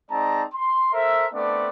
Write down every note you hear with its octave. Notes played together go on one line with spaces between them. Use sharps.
G#3 C4 D#4 D5 A5 A#5
C6
A4 A#4 C5 E5
A3 B3 C4 D4 D5